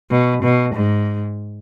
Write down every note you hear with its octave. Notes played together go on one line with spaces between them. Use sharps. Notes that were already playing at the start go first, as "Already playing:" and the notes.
B2
B2
G#2